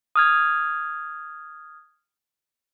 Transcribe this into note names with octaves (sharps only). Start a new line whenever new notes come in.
D#6 F6 G#6